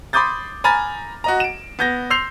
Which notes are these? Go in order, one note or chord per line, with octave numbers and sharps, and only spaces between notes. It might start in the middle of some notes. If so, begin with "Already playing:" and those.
B5 C6 D6 D#6 G6 A6
G#5 A#5 B5 F6 A6
F#4 D#5 A#5
D7 E7
B3 G6 A#6
C6 E6 G6 C7 F7